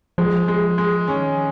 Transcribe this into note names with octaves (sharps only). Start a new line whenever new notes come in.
F3 G#3
G#3
G#3
D#3 C#4